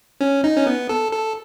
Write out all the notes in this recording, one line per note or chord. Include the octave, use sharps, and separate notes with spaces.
C#4
D#4
C#4
B3
A4
A4